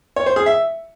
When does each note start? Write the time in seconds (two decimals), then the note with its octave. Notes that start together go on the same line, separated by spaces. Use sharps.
0.16 C#5
0.26 C5
0.36 G#4
0.46 E5